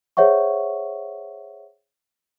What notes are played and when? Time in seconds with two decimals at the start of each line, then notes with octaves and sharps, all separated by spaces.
0.17 G#4 C5 C#5 E5 F#5 C#6